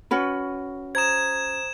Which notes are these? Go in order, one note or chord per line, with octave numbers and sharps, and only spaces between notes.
C#4 F#4 B4
C5 A#5 D#6 G#6 E7